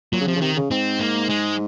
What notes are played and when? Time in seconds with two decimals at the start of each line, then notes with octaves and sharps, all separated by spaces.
0.12 A#2 F#3
0.21 C#3
0.27 C3 F3
0.36 C#3
0.41 C3 D#3
0.56 C#3
0.70 G#2 C4
1.00 A#3
1.29 G#3